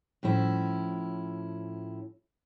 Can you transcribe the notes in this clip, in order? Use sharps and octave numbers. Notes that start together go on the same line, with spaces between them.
A2 F3 C#4 E4